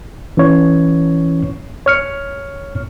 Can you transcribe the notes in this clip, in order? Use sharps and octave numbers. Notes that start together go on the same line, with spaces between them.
E3 C#4 C#5
C#5 F6 C#7